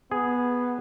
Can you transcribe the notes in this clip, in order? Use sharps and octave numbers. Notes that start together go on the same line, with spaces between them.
B3 G#4